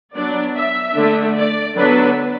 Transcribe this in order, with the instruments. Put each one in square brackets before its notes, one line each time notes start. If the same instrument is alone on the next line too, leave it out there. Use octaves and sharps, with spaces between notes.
[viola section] F#3 B3 D4 D5
E5
D3 A3 D4
D5
D3 F#3 B3 D4 B4